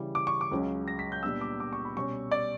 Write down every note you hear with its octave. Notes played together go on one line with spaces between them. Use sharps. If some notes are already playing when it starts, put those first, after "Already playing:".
Already playing: C#3 E3 G3
D6
C#6
D6
C#2 C#3 F#3 C#4
A#6
B6
G6
A#2 G3 B3 D4 E6
D6
D6
C#6
B5
B2 G3 C#4 C#6
D5